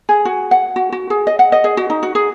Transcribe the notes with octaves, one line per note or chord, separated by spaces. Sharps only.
G#4
F#4
F#5
F#4
F#4
G#4
D#5
F#5
D#5
G#4
F#4
D#4
F#4
G#4